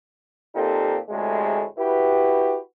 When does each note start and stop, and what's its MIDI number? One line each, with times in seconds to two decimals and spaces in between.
0.55 0.98 46
0.55 0.98 58
0.55 0.98 60
0.55 0.98 63
0.55 0.98 67
0.55 0.98 69
1.09 1.64 38
1.09 1.64 45
1.09 1.64 48
1.09 1.64 56
1.78 2.58 64
1.78 2.58 66
1.78 2.58 67
1.78 2.58 71